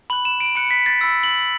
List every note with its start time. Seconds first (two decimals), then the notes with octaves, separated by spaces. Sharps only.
0.10 B5 F#6 F#7
0.25 E7
0.40 D7
0.55 B5 F#6 C#7
0.71 B6
0.86 A6
1.01 B5 E6
1.23 F#7